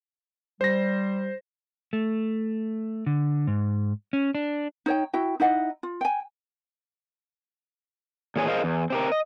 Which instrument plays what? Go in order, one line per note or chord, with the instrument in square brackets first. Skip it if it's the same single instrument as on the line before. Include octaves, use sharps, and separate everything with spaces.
[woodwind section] G3 [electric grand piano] C5 A#6
[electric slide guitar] A3
D3
G#2
C#4
D4
[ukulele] D#4 C#5 G5
E4 F#4 G5
D#4 E4 D#5 F#5
F4
G5 G#5
[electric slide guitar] A#2 E3 G#4 C#5 G#5
G#4 A#4 C5 D#5 F5
E2
C4 G4 A#4
D#5